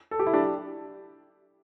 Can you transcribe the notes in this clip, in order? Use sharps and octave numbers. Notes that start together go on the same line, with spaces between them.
A4
G4
E4
D4 G4